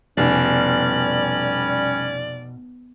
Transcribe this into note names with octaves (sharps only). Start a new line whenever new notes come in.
F1 B2 G3 C#4 D5